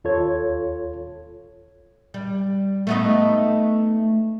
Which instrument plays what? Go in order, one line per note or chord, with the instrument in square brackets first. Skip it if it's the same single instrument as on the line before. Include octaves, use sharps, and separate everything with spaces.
[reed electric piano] D#2 F4 A4 C#5 G#6
[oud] G3
A3 B3 D#4